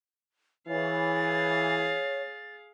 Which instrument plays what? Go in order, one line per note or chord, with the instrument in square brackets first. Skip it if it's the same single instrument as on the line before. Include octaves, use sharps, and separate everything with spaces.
[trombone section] E3 [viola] G#4 F5 [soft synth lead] C#5 [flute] A6